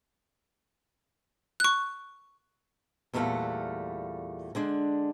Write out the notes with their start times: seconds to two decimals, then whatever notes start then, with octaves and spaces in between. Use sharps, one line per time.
1.60 C#6 F#6
3.13 E2 A#2 G3 A3 F5 F#5
4.55 D3 G#3 D4